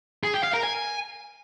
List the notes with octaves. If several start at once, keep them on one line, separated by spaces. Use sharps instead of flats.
G#4
G5
F5
A#4
G#5